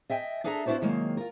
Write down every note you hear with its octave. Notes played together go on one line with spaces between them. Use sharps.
D#5 E5 G5 G#5
D4 G#4 A4 E5 G#5 A#5
B3 D4 E4 F#4 C5 D5
C3 D#3 F#3 G#3 A#3
F4 A#4